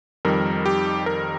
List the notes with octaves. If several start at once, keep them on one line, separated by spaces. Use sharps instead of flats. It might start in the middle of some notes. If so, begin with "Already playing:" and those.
F2 D#3 G3 A#4
G4
A#4